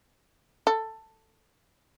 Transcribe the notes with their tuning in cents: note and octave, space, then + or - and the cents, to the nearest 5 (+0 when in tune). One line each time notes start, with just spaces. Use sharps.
A4 +10